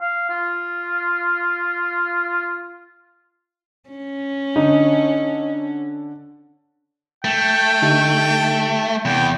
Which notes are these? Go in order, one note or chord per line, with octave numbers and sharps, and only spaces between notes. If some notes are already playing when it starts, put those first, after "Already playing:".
F5
F4
C#4
D3 D#4
A3 G5
D3 D#4 G4
E2 C3 G5